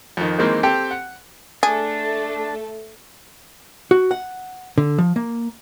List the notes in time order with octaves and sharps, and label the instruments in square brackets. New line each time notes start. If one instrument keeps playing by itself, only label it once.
[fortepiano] F2 D#3
D#3 E3 G#3 A#3 C4
C4 G4 A4 G5
F#5
[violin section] A3 A4 [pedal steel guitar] D4 [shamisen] G#4
[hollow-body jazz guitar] F#4
F#5
D3
F3
A#3